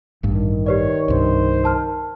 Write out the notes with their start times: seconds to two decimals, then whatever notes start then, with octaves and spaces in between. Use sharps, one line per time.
0.23 A1 G2 D#3
0.66 G4 B4 C#5 D5
1.08 C2 G2 C5
1.64 A#4 A5 F6